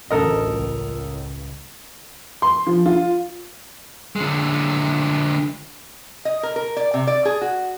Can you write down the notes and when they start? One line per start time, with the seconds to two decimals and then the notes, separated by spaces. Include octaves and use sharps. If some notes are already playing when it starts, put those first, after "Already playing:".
0.11 A1 D2 A4 A#4 D#5
0.53 C#2
2.42 C6
2.67 F3
2.86 F4
4.16 D3 G#3
6.25 D#5
6.43 A#4
6.56 A#4
6.77 D5
6.94 C3
7.07 D5
7.25 G#4
7.41 F#4